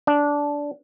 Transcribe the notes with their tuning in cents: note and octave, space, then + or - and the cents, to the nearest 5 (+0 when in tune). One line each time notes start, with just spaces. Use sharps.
D4 -15